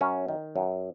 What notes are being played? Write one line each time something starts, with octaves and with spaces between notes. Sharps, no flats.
F#2 C#4
D#3
F#2